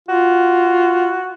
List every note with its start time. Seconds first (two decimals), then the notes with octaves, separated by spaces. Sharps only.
0.08 F4 F#4